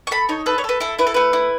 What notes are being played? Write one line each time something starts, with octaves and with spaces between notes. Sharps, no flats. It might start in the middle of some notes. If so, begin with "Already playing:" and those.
C#6
A4 B5
D#4 C#5
A4 B4
C#5
A4 B4
E4 A4
E4 B4
A4
A3 B4
E4